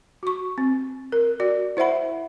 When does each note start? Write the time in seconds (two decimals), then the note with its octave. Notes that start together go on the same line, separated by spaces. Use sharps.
0.23 F#4 C#6
0.58 C4
1.12 A#4
1.40 F#4 D5
1.77 E4 C5 E5 F#5 B5